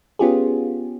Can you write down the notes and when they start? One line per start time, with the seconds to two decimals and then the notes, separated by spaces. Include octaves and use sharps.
0.19 B3 C#4 F4 G4 G#4